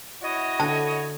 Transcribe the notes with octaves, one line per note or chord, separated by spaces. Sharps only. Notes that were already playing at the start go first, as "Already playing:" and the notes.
E4 F#4 C#5 D#5
D3 A5